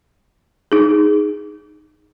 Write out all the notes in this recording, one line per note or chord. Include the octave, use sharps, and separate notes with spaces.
D#4 G#4